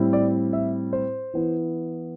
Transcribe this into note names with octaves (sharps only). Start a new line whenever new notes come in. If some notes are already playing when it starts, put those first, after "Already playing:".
Already playing: A2 G3 C4 E4
D5
E5
C5
E3 B3 E4